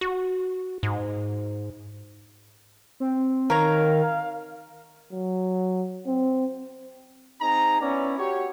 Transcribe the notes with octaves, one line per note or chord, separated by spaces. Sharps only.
F#4
G#2
C4
D#3 A#4 C#5 F5 A#5
F#3
C4
C4 D#4 G#4 A#5
B3 C#4 E4 D5
F#4 G4 C#5